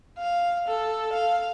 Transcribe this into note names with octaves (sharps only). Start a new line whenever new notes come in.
F5
A4
F5